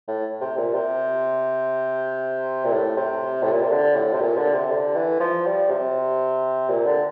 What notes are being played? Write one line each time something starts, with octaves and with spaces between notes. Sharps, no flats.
A2
C3
A#2
C3
A#2
A2
C3
A2
A#2
C3
D3
A2
C3
A#2
D3
C3
D3
E3
F3
G3
C3
A#2
D3